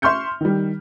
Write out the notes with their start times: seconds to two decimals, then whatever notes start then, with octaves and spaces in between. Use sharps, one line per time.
0.02 E5 C6 C#6 F6 G6 C#7
0.41 D#3 G3